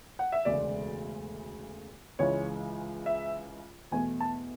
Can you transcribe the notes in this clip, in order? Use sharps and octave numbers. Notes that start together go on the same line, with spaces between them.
F#5
E5
E1 D2 C#3 G#3 D5
C#2 C#3 E3 G#3 C#5
E5
E2 B2 A3 G#5
A5